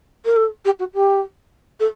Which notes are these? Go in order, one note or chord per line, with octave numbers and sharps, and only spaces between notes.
A#4
A4
G4
F#4
G4
A4